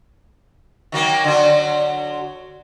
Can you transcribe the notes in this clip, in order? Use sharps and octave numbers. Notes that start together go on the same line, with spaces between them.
D#3 F#3 A#3
D3 F#3